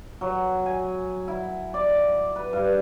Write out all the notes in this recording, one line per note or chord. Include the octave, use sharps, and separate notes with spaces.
F#3
G#5
E4
D5
B4
G2